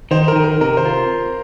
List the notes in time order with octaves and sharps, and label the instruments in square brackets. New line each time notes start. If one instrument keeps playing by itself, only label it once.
[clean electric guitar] D#3 [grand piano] C5
[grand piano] A#4
[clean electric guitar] D#3
[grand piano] A#4
[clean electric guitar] C3 [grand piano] A#4
[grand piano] C5
[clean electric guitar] F4